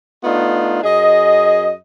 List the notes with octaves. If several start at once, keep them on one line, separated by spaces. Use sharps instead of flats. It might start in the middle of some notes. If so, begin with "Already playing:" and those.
A3 B3 D4 D#4 F4
F#2 G#4 D#5